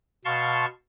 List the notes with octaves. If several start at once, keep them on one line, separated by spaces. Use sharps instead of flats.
B2 F5 A5 C6 C#6